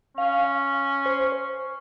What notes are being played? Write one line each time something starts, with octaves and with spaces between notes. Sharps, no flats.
C#4 F5
C5